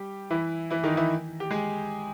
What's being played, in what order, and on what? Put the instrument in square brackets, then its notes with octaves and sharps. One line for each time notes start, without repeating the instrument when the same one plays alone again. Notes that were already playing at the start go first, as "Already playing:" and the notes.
Already playing: [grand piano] G3 G4
E3 E4
E3 E4
D#3 D#4
E3 E4
G4
G#3 G#4